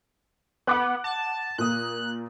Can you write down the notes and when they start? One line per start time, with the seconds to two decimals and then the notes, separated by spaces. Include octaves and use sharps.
0.67 B3 F#5 D6 F#6
1.04 A5
1.58 A#2 A#3 D#6 F#6